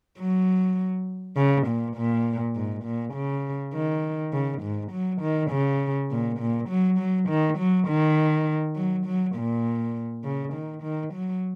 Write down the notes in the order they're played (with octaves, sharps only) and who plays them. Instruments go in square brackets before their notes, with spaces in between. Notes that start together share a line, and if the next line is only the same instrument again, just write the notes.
[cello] F#3
C#3
A#2
A#2
G#2
A#2
C#3
D#3
C#3
G#2
F#3
D#3
C#3
A#2
A#2
F#3
F#3
D#3
F#3
D#3
F#3
F#3
A#2
C#3
D#3
D#3
F#3